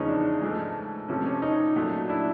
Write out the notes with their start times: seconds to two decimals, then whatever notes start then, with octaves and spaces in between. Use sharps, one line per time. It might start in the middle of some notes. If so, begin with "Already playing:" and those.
Already playing: E2 C#3 F3 G#3 C#4 D#4
0.08 D4
0.42 G#2 F3 A3
1.08 C3 F3 A3 C#4
1.26 C#4
1.42 C#4 D#4
1.76 A#2 F#3 A3
2.09 D4 E4